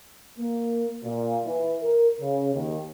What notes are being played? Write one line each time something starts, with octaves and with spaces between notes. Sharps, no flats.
A#3
A#2
E3
A#4
C#3
D#2